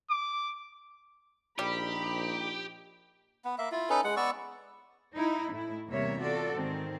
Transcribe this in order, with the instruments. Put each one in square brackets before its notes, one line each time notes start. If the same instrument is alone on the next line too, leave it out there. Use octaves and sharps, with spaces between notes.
[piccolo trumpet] D6
[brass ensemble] A#1 D#4 [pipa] G3 [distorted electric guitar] G4 [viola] B5
[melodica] B3
A#3 E5
E4 F4
C#4 D#4 A4 B4
G#3 F#5
B3 D5 C#6 E6
[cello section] D#4 E4
A2 E4
E2 C3 G3 A#3 C#5 E5
F4 F#4 A4 D5
G#2 D#3 C4